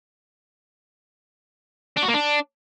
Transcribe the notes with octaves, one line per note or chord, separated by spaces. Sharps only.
D4
F#4
A#3
D4